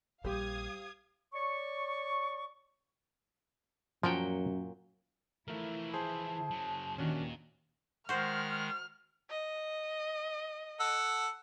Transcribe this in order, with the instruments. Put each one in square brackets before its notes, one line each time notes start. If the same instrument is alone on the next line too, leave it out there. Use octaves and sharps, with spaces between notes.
[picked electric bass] A#1 [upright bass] G3 [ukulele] G4 C5 [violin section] F5 D#6 G#6
[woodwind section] C#5 D5 C#6
[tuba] F#2 [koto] A#2 F#3 G5 [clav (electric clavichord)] F3
[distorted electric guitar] E3 F3 [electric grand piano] A3 A#4 [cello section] E4
[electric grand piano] G#4 C5 [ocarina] A5
[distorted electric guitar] C#3 F#3
[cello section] D#2 D#3 [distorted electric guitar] A#2 [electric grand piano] C#4 D4 F#4
[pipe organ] D#3 G#3 [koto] F#4 C5 [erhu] F6
[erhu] D#5
[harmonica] A4 F#5 E6